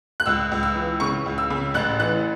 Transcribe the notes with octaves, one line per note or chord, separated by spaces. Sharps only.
F#6
C#2 E6
C#2
E6
E3
C#3 C#6
C#2
E6
C#3
A1 F#6
E3 F#6